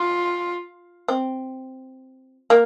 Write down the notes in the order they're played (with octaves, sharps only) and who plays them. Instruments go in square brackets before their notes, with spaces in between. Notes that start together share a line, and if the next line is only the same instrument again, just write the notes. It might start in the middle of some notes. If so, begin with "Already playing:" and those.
Already playing: [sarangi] F4
[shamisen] C4
A#3